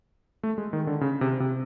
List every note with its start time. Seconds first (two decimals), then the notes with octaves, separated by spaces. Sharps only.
0.43 A3
0.58 G#3
0.73 D#3
0.87 D3
1.01 C#3
1.21 C3
1.40 C3